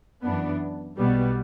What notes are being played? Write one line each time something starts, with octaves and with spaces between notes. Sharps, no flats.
F#2 E3 B3 D4
B1 B2 G3 B3